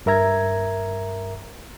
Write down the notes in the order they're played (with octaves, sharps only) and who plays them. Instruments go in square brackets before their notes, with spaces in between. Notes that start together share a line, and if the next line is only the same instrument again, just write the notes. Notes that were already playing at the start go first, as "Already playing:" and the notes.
[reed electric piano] G2 A#4 E5 A#5 G#6